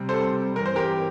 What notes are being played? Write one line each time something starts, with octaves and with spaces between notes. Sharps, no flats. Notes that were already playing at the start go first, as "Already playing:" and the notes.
Already playing: C3 G3 C4
A4 C5
G2 E3 G3 C4 A#4
C5
G4 A#4